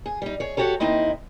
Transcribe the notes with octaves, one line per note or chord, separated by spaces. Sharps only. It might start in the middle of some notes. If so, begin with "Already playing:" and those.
G#4
G3 D#4
G#4 C#5
F#4 G4 A4 C#5
D#2 C4 D#4 E4 D#5